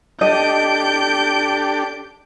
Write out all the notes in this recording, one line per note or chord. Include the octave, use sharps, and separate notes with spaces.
D4 G4 A4 D#5 G6 D7